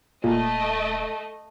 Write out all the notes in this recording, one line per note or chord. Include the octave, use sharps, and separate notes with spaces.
D#1 A#2 A3 D#5